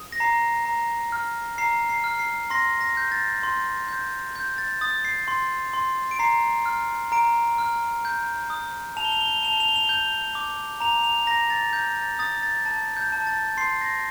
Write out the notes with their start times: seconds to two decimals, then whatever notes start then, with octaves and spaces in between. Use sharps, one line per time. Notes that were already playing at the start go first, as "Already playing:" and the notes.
Already playing: D#6
0.12 A#6
0.20 A#5 C7
0.65 A#5
1.12 F6
1.58 A#5 C7
1.89 C7
2.04 F6
2.19 C7
2.50 C6 A#6
2.81 A#6
2.97 G6
3.12 A6
3.43 C6
3.88 G6
4.36 G6
4.58 A6
4.81 D#6 A6
5.05 C7
5.28 C6
5.73 C6
6.11 D7
6.19 A#5 C7
6.66 F6
7.12 A#5 D7
7.58 F6
8.05 G6
8.50 D#6
8.97 A5 F7
9.04 G7
9.12 F7
9.21 G7
9.28 F7
9.36 G7
9.43 A5 F7
9.53 G7
9.60 F7
9.69 G7
9.76 F7
9.85 G7
9.89 G6 F7
10.35 D6
10.80 A#5 F7
11.04 F7
11.27 A#5 A#6
11.50 A6
11.73 G6
11.96 A6
12.19 D#6 A6
12.43 A6
12.65 A5 A6
12.97 G6
13.12 A5
13.27 A6
13.57 C6 C7
13.81 A#6